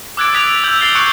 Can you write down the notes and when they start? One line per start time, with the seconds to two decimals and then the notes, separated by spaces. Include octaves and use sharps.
0.17 D6 E6 F#6 G#6 A6 D7
0.33 D6 D#6 G#6 B6 D7 F7
0.64 E6 G6 F#7
0.80 E6 A6 C7 G7
0.95 C#6 E6 F#6 C#7 D7